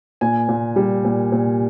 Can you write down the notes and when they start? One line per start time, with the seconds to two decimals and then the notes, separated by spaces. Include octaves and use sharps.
0.21 A#2 G#5
0.49 A#2
0.76 G3
1.05 A#2
1.32 A#2